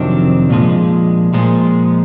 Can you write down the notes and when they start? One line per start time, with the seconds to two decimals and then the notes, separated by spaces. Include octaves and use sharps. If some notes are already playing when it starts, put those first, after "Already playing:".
Already playing: F2 C3 D#3 F#3 C4 D4
0.50 A#2 F3 G#3
1.34 A#2 F3 G#3